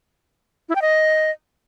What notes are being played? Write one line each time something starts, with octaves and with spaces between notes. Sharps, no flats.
E4
G5
D#5